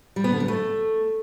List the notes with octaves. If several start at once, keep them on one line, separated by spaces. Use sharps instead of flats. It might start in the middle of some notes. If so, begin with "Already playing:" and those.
G3
B3
D3
G3
A3